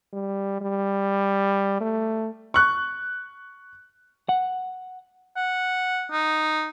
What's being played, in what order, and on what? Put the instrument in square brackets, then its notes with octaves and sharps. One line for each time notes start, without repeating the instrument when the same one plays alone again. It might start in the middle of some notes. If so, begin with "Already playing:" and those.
[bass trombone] G3
G3
A3
[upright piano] C#6 F#6
[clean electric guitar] F#5
[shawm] F#5
D#4